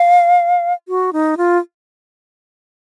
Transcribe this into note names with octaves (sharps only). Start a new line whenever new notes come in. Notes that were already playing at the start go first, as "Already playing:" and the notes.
Already playing: F5
F#4
D#4
F4